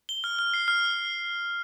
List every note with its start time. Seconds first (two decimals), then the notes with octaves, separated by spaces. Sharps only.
0.09 G7
0.24 F6
0.39 F6
0.54 C7
0.68 F6